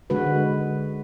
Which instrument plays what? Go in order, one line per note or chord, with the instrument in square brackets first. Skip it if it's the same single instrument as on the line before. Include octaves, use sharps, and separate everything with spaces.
[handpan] D3 G#3 F#4 B4